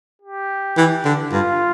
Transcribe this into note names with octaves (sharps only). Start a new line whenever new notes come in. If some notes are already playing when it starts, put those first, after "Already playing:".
G4
E3
D3
G2 F4